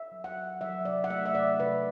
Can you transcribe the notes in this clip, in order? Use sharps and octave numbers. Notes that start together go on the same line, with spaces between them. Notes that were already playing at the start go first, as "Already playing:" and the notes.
Already playing: E5
F#3
F#5
F#3
F#3 E5
C3 D5
F#5
A3 E5
E5
C3 D5
C3 B4